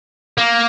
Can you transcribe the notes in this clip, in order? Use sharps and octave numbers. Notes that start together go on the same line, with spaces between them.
A#3